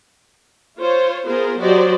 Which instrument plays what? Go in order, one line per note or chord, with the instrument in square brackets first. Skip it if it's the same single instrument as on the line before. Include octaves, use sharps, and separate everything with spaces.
[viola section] F4 C5 C#5
B3 F4 G#4 A#4 C5
F#3 F#4 G4 C5 D5 D#5